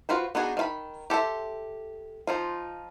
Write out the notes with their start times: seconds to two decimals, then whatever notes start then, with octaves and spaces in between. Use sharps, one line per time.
0.09 F4 F#4 B4 C5
0.35 B3 D4 D#4 F#4 G#4
0.57 D#3 F4 B5
1.10 G4 A4 C5 E5
2.27 F3 D#4 F4